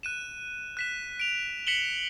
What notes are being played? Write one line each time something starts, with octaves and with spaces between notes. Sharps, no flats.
F#6 D#7 E7
F#6 B6 E7
D7 F7
B6 C#7 E7 F#7 G7